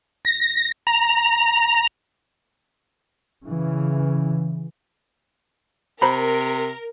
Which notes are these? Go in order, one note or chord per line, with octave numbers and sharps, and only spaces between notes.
A#6
A#5
C#3 E3
C3 A#4 C5 A#5 B5